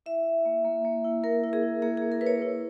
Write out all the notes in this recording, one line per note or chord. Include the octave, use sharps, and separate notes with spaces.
E4 E5
E4
A#3
A#3
A#3
E4
A#3 A#4
E4
G#4
E4
A#3 G#4
A#3 G#4
A#4
E4 B4
C#5
E4